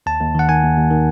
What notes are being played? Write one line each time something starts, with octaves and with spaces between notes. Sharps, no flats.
D#2 A5
D#2
D#3 F#5
D#3 G#5
D#2
D#2
D#3